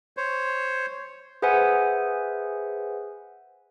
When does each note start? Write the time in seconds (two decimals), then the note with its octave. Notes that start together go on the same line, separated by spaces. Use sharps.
0.17 C5 C#5
1.42 G#4 B4 C5 E5 F#5 G#5